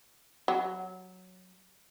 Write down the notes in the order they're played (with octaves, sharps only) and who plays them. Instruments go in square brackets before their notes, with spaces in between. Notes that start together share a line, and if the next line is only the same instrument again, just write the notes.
[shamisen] F#3